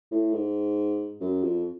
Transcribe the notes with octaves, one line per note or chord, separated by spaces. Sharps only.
A2
G#2
F#2
F2